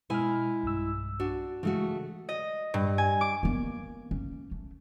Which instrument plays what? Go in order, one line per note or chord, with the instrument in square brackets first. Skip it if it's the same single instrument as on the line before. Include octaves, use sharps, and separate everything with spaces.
[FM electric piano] B2 F6 [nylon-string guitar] G#3 E4 G#5
[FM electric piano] B1 G2 E6
[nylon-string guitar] D4 F#4
[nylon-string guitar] C#3 A3 F#4 [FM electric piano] E3 G#3
[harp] D#5
G2
G#5
D6
[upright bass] A#3 B3
C#4
A3